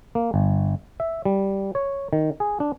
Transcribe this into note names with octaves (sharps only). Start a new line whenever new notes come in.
A#3
G1
E5
G3
C#5
D#3
G#4
D4